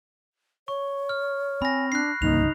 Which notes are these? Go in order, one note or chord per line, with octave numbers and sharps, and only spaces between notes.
C#5 C#6
F6
C4 G#5 B5 A#6
D4 F#6 C7
C2 G2 C#3 A#3 D#4 F7